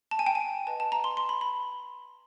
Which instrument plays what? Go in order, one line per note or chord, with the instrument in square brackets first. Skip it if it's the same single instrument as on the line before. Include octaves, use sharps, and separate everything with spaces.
[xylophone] A5
G#5
G5
G#5
B4 D#5 G5 A5
A5
A#5
C6
C6
B5
B5